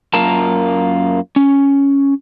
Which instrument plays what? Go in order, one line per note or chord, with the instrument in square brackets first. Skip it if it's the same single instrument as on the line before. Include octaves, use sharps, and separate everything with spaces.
[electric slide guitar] F#2 A#3 F4 A#4 A5
C#4